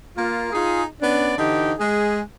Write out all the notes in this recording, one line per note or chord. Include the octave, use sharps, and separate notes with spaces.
A#3 F4
D#4 F4 G#4
B3 C#4 D4 D5
D3 E3 D#4 G4
G#3 G#4